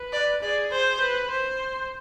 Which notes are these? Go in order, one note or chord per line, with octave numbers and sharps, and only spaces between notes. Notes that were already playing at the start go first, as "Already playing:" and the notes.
Already playing: B4
D5
G#4 D5
C5
B4
C5